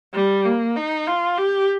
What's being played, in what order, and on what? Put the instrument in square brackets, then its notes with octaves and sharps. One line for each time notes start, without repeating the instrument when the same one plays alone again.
[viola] G3
A#3
D#4
F4
G4